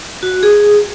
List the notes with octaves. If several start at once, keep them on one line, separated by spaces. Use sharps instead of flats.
F#4
G#4